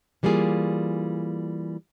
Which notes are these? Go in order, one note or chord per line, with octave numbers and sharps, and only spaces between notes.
E3 G3 A#3 F4 G#4